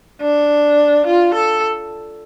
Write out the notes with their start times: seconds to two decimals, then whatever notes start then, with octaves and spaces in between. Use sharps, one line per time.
0.21 D4
1.06 F4
1.34 A4